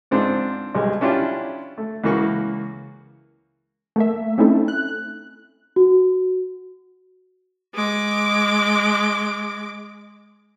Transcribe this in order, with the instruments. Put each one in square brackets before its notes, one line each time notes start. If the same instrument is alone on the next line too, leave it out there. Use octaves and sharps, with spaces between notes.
[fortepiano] G#2 C4 D4 F4 C6
B1 G3 G#3
C#4 D4 E4 F4 G4
A3
C#2 E3 A#3 F#4 C#6
[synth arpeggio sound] A3 A#3 E5
A3 C4 C#4 D#4 E4 A4
F#6
[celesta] F#4
[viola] G#3 D6